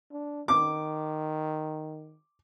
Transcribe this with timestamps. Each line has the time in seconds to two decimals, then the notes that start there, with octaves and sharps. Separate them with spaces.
0.12 D4
0.48 D#3 D6